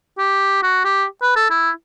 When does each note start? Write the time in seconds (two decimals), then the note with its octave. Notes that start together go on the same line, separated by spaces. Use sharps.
0.18 G4
0.63 F#4
0.85 G4
1.22 B4
1.36 A4
1.51 E4